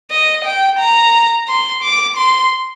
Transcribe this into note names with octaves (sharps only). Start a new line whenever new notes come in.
D#5
G5
A#5
C6
D6
C6